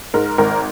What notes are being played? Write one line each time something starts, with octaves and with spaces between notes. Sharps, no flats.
G#2 A#4
G#1 A#4